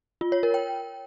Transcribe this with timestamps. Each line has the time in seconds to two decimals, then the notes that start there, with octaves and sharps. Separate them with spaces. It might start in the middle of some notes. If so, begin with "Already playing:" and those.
0.21 F4
0.32 C#5
0.43 A#4
0.54 G5